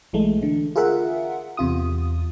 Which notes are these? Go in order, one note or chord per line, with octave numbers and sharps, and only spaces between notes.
B1 E3 G#3 A3
D3
F4 G#4 A#4 E5 F#5
E2 C3 F4 D#6